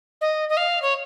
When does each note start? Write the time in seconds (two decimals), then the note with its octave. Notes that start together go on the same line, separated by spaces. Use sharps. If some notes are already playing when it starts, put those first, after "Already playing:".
0.21 D#5
0.49 D#5
0.57 F5
0.82 C#5